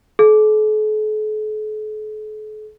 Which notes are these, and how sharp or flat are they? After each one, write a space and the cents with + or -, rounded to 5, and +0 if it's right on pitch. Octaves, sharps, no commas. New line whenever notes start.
A4 -45